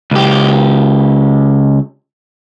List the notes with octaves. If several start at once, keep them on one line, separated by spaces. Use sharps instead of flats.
C#2 G4